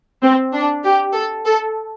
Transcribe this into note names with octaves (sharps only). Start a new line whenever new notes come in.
C4
D4
G4
A4
A4